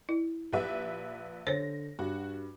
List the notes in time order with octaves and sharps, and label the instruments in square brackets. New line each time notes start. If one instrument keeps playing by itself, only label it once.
[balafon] E4
[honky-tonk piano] A#1 B4 E5 [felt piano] G4
[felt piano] D3 A4 [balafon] C5 C#5 [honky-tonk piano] A#6
[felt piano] G2 [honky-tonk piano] F#4